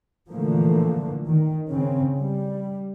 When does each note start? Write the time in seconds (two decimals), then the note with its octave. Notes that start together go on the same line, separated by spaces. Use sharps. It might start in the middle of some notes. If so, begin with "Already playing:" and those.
0.29 A#2 D3 E3 F3 A3 A#3
1.27 D#3
1.70 C#3 C4
2.18 G3